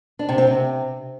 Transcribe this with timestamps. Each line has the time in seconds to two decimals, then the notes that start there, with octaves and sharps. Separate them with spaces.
0.19 D4
0.29 C3
0.38 C4
0.47 C3